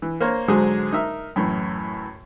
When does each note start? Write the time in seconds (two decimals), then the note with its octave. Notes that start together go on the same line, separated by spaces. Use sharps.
0.02 E3
0.21 A#3 A#4 C5 C#5
0.48 G#2 D3 F#3 G#3 G#4 C5
0.92 D#4 A#4 E5
1.36 F#2 A2 E3